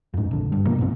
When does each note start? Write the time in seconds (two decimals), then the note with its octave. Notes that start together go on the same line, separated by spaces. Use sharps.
0.14 F2 G#2
0.31 A#1 D3
0.52 G2
0.66 B2 F3 A#3
0.78 B1 F#2 B2 C4